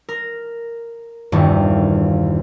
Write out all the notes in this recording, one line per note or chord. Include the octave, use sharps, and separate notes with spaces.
A#4
E1 A#1 E2 G2 D#3